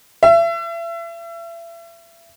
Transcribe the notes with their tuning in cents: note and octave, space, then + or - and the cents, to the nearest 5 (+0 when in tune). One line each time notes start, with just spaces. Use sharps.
E5 +35